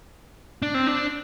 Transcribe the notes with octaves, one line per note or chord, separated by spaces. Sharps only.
D4
C4
D4